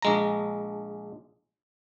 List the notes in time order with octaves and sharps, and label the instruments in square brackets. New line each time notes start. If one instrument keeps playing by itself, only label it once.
[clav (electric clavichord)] A#1 G#3 A#5